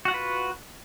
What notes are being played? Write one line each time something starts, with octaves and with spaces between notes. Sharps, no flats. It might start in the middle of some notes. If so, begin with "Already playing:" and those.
F4 F#4 B4 F#5